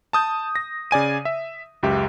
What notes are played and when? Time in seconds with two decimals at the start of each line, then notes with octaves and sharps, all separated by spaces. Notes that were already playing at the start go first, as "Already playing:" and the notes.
0.13 A5 D#6 G6
0.56 A#6
0.91 C#3 D5 G#5 D#7
1.25 E5
1.83 C#2 F#2 G4 E5